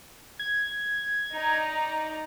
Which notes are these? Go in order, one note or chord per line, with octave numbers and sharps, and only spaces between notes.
G#6
D#4 D5 A#5